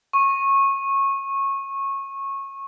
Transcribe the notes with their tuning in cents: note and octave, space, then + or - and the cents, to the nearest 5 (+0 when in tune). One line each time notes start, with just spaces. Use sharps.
C#6 -20